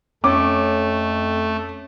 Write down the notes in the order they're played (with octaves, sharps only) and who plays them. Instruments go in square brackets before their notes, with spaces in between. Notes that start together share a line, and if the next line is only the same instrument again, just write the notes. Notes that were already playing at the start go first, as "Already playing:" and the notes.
[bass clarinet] F2 [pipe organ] A3 [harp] C#4 [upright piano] D6